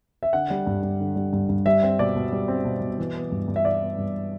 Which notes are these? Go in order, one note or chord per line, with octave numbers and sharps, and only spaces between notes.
E5
D3 F#5
G3
G2
G2
D3
G3
G2
G2
G3 E5
C4
B2 D5
B2
G3
C4
B2
B2
E3
B3
G2
G2
E5
E3 D5
B3
G2